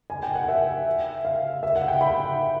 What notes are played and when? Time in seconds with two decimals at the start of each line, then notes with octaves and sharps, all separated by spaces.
0.10 G#5
0.23 G5
0.35 F#5
0.49 E5
1.25 F5
1.63 E5
1.76 F#5
1.88 G5
2.01 B5